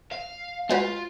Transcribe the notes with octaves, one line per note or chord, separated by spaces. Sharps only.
F5
G#3 F4 F#4 B4